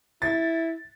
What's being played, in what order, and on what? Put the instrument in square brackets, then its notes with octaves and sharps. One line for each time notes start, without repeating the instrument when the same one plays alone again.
[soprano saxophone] E4 [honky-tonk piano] A6